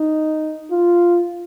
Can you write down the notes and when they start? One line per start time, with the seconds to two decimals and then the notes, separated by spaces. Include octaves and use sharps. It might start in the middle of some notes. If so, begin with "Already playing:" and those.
Already playing: D#4
0.71 F4